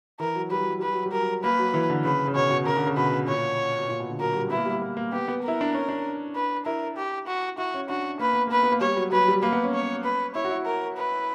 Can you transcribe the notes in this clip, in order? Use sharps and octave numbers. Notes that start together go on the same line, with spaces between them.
E3 A#4
F#3
G3 B4
F#3
G3 B4
F#3
G3
A#4
F#3
A#3 B4
F#3
E3
D3
C#3 B4
C#3
B2 C#5
B2
C#3 A#4
D3
C#3
B2 B4
A#2 C#5
B2
A#2
B2
D3
F#3 A#4
G3
B3 E4
A#3
G3
A#3
A#3
B3 G4
B3
E4 A#4
D4
C#4
D4
B4
E4 A#4
G4
F#4
E4 F#4
C#4
D4 F#4
A#3 B4
B3
A#3 B4
B3
A#3
G3 C#5
F#3
F#3 B4
G3
A#3 B4
B3
C#4
C#5
B4
E4 C#5
F#4
E4
A#4
B4